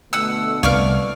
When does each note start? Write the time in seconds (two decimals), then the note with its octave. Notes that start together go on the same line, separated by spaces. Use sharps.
0.13 B2 D3 A3 F#5 E6
0.63 C2 B4 D5 F5 C#6 D6 F6